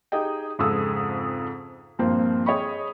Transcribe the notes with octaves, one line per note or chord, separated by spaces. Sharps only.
D#4 G4 G#4 D#5 G5
F2 G#2 C#3 G#4 A4 E6
G2 A#2 F3 A#3 C4
G#4 C#5 D#5 G5 B5 C#6